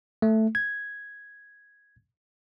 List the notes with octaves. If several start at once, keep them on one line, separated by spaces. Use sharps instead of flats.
A3
G#6